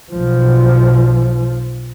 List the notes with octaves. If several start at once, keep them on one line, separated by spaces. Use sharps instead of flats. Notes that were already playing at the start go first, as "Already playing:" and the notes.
B1 F3